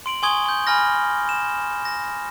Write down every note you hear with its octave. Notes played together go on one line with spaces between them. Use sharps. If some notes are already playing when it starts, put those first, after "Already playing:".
C6 D7 F#7
G#5 C6 C#6 D#6 G#6 G7
C6 G6
G#5 B5 F6 A#6
E7
A#6